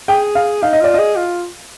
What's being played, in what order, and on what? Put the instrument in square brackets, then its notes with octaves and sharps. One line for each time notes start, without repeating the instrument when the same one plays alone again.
[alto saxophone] G#4 [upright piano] G5
[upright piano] F5
[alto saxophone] D#4 [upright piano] F5
[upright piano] D#5
[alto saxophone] F4 [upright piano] D5
[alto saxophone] G#4 [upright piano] D#5
[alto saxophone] F4